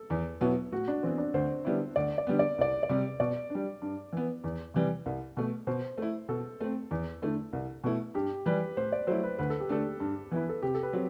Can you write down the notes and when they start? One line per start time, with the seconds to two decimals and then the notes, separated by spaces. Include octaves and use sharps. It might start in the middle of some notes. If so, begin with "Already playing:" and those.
Already playing: A4
0.10 E2
0.41 B2 F#3 B3 E4
0.72 A2 F#4
0.88 D4
1.03 E3 B3 C4
1.18 D4
1.34 D2 C5
1.65 D3 G3 B3 E4
1.96 D2 D5
2.18 D5
2.27 D3 G3 B3
2.39 D5
2.58 C2 D5
2.83 D5
2.89 C3 G3
3.20 B2 D5
3.50 G3 D4
3.82 G2
4.13 E3 B3
4.44 E2
4.74 C3 E3 G3
5.06 C2
5.37 B2 A3
5.67 B2 C5
5.98 A3 E4
6.29 B2 A4
6.61 A3 C4
6.91 E2
7.22 D3 A3 E4
7.53 C2
7.84 B2 A3 E4
8.14 G2 G4
8.46 E3 G3 B4
8.77 A2 C5
8.92 D5
9.07 F#3 A3 E4 C5
9.23 B4
9.39 D2 B4
9.50 A4
9.60 G4
9.69 D3 A3 D4 A4
10.00 G2
10.31 E3 B3 E4 B4
10.49 A4
10.63 C3 G4
10.75 A4
10.83 B4
10.93 F#3 C4